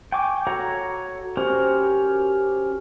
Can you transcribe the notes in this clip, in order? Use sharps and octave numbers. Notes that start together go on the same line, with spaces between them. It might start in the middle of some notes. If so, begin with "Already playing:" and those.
G5 G#5 C#6 D6
F#4 A4 C#5 F#5 A#5
C#4 F#4 G4 A#4 C5